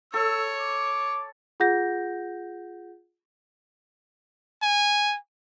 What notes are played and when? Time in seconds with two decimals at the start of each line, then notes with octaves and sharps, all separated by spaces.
0.14 A4 C#5 E6
0.59 D6
1.60 F4 G#4 F#5 G6 A#6
4.62 G#5